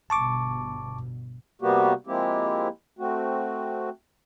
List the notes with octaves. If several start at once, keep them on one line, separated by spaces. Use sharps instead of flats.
G1 B2 A5 C#6 D6
C3 G3 A#3 B3 F#4 G4
F3 G#3 A#3 C4 E4 G4
A3 C4 F#4